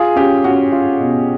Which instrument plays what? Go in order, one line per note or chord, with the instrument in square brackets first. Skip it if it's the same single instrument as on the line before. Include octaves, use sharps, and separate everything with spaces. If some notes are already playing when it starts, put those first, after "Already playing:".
Already playing: [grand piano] F4 [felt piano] G#4
[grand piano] C#4 [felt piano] G4
[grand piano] C#4 [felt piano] F#4
[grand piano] F4
B2